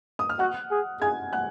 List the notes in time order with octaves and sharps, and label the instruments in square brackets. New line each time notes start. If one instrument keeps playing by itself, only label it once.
[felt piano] D#6
F6
[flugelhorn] F#4 [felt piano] F#5 F#6
[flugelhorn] G#4
[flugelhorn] G#4 [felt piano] G#5 G#6
[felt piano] F#5 F#6